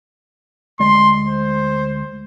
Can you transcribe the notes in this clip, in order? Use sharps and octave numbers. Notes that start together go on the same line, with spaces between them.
D2 G#3 D5 C6
C5